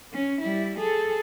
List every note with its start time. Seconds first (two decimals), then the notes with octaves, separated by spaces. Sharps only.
0.13 C#4
0.41 G3 E4
0.79 G#4 A4